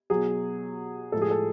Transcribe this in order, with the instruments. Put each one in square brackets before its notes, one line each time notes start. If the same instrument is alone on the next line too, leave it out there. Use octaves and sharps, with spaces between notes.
[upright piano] B2 F#3 G#4
A2 F3 G#3 A4
G#4
A4